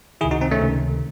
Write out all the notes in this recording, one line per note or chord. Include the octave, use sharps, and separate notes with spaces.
C#2 C3 D#3 E4 G#4
D#4 F#4
C4 D#4
A3 C#4
C#2 C3 D#3